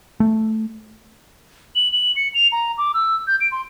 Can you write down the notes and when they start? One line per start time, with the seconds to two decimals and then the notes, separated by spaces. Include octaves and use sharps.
0.20 A3
1.75 F#7
1.92 F#7
2.16 C#7
2.34 F7
2.52 A#5
2.78 D6
2.94 E6
3.27 G6
3.40 D7
3.52 C6